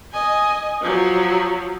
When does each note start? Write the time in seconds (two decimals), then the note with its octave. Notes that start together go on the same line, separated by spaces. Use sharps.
0.12 D#5 G#5
0.82 F3 F#3